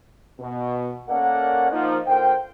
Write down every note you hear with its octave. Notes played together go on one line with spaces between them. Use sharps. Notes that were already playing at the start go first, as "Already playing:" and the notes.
B2
A#3 C#4 A4 A#4 D5 F#5
F3 A#3 D#4
D3 A#3 F4 C5 G5